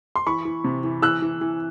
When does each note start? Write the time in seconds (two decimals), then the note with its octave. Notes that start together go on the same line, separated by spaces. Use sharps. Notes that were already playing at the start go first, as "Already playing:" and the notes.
0.16 C6
0.26 E3 B5 C#6
0.45 E3
0.64 C3
0.84 E3
1.02 E3 E6 F#6
1.22 E3
1.41 E3